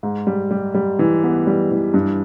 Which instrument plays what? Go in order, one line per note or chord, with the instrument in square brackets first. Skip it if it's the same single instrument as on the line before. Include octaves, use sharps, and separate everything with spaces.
[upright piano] G#2
G3
G3
G3
E3
B3
G3
E3
G2